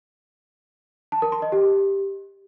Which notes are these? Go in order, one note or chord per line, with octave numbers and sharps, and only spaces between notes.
A5
A#4
C6
D#5
G4